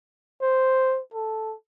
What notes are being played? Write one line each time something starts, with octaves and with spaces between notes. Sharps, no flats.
C5
A4